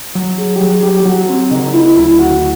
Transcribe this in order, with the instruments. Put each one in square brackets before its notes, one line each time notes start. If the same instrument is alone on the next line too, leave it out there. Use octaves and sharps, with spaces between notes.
[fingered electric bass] F#3
[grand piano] G#4
G4
[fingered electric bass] F#3 [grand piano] G#4
[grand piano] G4
G4
[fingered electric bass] F#3 [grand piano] F#4
[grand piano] C4
[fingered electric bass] C#3 [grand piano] D#4
[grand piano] E4
[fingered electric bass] D2 [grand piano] E4
[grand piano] F#4